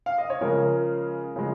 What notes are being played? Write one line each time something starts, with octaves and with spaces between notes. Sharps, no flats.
F5
D#5
C#5
C#3 F3 G#3 A#4
C#3 F3 G#3